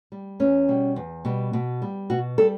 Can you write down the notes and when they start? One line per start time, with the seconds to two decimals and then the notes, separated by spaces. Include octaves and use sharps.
0.12 G3
0.40 E2 C#4
0.68 B2 G3
0.96 E2
1.25 B2 G3
1.53 B2
1.82 G3
2.10 B2 F#4
2.38 G3 A4